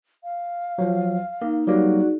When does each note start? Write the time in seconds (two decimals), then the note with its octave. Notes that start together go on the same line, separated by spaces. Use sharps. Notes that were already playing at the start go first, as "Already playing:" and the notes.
0.24 F5
0.78 F3 F#3
1.42 A#3 D#4
1.67 F#3 G3 A#3 D#4 F#4 G#4 D5